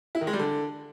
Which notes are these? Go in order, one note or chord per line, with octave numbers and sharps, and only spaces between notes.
E4
D#3
G#3
G3
D3